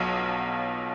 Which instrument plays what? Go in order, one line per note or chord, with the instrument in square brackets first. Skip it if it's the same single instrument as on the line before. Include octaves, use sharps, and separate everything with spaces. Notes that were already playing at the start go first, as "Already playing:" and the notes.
Already playing: [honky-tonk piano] B1 B2 F#3 F4 F5